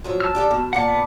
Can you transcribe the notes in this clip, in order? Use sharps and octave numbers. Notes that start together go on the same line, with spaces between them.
F3 F#3 E5
A5 E6 F6
D4 G4 A4
B2
A#2 D5 F#5 A5
B3